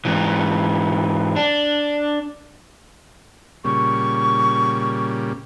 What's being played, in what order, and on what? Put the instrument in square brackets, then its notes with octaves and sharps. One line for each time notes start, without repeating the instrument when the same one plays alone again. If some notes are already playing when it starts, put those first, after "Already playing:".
[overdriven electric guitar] G#2 E3
D4
[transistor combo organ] A#2 C#3 G3 [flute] C#6